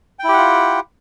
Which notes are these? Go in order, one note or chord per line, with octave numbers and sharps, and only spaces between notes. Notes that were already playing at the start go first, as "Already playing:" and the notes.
E4 F4 G4 F#5 G5